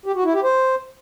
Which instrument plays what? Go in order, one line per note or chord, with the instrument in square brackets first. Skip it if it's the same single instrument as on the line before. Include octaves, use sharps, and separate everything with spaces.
[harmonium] G4
F#4
E4
G4
C5